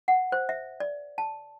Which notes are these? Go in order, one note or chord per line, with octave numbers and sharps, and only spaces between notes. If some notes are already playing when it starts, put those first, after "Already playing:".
F#5
C5
E5
D5
A5